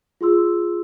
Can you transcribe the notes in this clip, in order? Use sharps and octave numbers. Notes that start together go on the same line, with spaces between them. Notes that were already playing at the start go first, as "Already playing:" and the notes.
F4 G#4 C6 E6